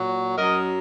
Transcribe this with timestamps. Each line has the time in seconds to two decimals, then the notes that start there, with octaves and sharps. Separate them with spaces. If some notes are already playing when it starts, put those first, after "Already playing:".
Already playing: A#2 F#3
0.37 F#2 F#3 A#4 D#5